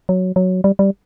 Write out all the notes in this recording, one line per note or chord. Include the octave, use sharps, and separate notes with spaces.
F#3
F#3
G3
G3